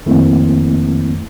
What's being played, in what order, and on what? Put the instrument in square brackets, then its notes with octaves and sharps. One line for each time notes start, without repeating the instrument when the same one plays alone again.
[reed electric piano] F2 D#3 A3 A#3 C4 E4